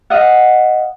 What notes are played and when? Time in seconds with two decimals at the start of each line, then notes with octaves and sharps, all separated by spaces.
0.10 D#5 F5 F#5